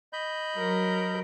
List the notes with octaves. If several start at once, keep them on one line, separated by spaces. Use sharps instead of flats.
D#5 B5 G6
F#3 A#4